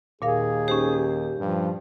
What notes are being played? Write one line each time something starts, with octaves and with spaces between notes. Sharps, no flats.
D#2 A#2 G#4 A#4 F5
C#4 D#4 G4 C5
G2 F3